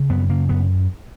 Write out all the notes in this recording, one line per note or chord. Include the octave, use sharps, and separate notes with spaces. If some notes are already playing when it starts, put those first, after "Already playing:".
Already playing: C#3
F#2 B3
C#3 A#3
F#2 B3